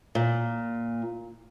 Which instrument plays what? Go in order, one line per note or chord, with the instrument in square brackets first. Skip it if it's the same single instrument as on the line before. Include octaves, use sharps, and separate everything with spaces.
[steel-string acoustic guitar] A#2